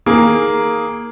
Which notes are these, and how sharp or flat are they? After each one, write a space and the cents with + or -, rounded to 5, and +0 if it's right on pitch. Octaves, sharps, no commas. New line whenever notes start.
D#3 +35 A#3 +0 G#4 +0